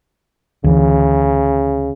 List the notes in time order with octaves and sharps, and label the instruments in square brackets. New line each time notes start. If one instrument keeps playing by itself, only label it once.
[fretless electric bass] D2 E3 [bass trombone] C#3